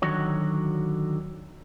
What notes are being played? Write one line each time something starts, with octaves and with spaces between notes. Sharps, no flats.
D3 D#3 F#3 F#4 C#5